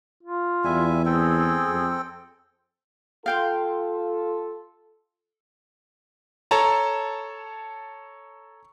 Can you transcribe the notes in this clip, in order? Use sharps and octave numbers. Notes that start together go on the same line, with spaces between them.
F4
E2 G3 E5 G#5
C4 G#4 A4 G5
F2
F4 A4 F5 G5 C6
A4 C#5 A5 A#5